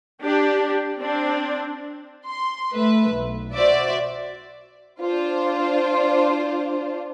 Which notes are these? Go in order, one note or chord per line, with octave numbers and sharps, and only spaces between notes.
D4 G4
C4 D4
C6
A3 B4 E5
B1
F#4 C5 D5 E5
D4 F4 C5